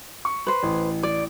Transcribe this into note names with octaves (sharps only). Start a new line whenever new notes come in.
C#6
B4 C5
A1
D5